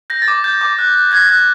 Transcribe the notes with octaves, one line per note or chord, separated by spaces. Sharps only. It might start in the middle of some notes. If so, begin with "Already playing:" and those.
G6 A#6
A6
D6
G6
D6
F#6
F#6
F#6 G#6
F#6